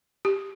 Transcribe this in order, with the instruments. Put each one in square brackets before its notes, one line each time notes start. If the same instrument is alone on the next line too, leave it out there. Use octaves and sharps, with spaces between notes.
[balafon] G4